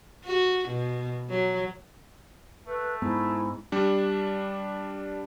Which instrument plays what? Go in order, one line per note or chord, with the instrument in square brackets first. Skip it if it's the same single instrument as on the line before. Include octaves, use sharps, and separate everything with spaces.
[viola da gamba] F#4
B2
F#3
[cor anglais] A3 [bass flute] B4
[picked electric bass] G#2 [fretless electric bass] B3 [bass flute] E4
[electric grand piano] G3 D4